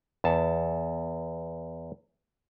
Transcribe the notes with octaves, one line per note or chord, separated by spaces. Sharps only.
E2 A5